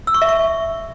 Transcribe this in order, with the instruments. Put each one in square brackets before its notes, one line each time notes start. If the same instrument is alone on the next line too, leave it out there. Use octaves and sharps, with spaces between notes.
[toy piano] E6
C#6
E5
C#6